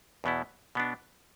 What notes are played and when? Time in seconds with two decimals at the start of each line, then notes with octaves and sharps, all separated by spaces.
0.24 E2 B2 B3 E4
0.75 B2 B3 D4